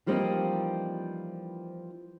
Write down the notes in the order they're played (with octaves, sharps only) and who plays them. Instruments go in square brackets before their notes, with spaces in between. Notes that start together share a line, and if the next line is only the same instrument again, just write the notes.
[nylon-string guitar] E3 F3 G3 A#3 C4 D#4